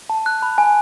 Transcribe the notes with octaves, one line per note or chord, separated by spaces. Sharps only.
A5
F#6
B5
G#5